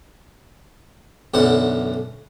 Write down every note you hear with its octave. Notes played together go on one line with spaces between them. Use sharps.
B1 F#2 D3 E3 F#5